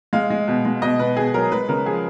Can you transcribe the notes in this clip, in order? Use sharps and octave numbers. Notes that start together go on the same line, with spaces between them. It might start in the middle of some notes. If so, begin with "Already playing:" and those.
G#3 F5
G#3
B2
G#3
B2 D#5
B2 B4
B2 G#4
F#3 A#4
G#3 B4
C#3 A#4
F3 G#4